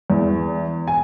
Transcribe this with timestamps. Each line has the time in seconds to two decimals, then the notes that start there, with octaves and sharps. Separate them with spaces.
0.10 E2
0.87 G#5